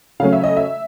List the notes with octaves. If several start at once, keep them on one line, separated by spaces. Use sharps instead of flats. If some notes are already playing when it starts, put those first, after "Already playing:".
C#3 F#3 A3 C#4 F5
E5
D#5
E5